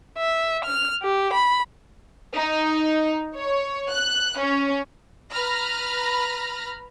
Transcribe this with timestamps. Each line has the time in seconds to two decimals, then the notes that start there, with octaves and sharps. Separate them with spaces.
0.17 E5
0.64 F6
1.01 G4
1.32 B5
2.35 D#4
3.36 C#5
3.91 F#6
4.39 C#4
5.33 B4 A#5 B5 F6 A#6